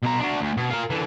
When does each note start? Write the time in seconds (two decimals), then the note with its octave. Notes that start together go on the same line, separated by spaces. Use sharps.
0.03 B2 A#5
0.19 D4 F#4
0.41 D2
0.57 B2
0.70 F4 A#4
0.90 D3 E3